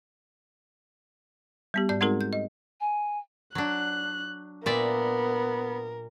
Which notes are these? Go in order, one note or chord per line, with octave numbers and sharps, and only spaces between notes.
G3 B3 G4
G#2 D5 G6
G#3 C4 D#4 F#4 G#4 A#4
G6
D#5
G#5
F#3 D4 F#6
A#2 B3 A#4 D5 E5